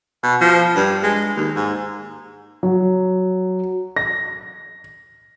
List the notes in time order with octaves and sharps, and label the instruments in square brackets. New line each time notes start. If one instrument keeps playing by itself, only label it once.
[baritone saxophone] B2
F3
G2
G#3
D#2
G#2
[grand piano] F#3
A#6